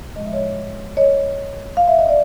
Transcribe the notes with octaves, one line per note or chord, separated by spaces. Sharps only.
A2 F3 G#3 D#5
E5
C#5 D#5
C#5 D#5
F5
E5
D#5
D5